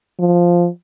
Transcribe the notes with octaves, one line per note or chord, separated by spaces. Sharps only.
F3